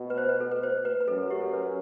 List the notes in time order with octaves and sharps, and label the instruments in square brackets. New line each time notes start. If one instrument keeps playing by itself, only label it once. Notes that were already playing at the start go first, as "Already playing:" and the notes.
Already playing: [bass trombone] B2
[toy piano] B4
C5
B4
A4
B4
C5
B4
B4
[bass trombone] F#2 [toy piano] A4
[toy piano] G4
A4
B4